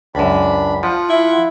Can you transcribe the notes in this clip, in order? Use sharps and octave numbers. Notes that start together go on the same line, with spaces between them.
C#2 F#2 D4 B5
F3 F4 F#5
E4